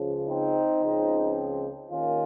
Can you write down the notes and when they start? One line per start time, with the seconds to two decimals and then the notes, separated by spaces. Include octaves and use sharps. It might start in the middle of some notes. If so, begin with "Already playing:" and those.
Already playing: C#2 C#3 F3
0.27 C4 D#4
0.82 C#2 C#3 F3 C4
1.90 D#2 D#3 A#3 C#4 F4